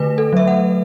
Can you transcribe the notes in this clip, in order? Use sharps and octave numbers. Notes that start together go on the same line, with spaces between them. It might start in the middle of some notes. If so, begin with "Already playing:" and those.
Already playing: D3 A3 B4
A4
F#3 E5
F#5